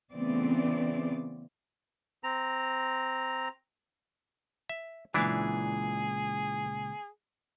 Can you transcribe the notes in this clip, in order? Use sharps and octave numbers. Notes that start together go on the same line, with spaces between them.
C#3 E3 A3 B3 C4 D5
C4 A#5
E5
C#2 A#2 E3 D4 E4 G#4